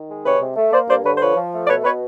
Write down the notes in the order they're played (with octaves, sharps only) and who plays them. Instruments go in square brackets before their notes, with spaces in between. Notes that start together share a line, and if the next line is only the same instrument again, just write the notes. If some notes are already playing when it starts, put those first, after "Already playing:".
Already playing: [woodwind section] D#3
G#3
C3 B4 C#5
C3
A3
A#3 C5 D5
G2 C5 D5
D3 B4 C#5
C5
F3 B4 C#5
F3
A3
D5
B2 B4 C#5
B2 B4 C#5